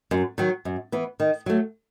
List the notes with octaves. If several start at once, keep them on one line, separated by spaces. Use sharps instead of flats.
F#2
D#3 F#3
F#2
E3 B3
D#3
F#3 A3